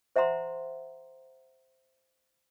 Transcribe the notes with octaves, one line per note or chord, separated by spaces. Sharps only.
C5 E5 F#5 A#5 C6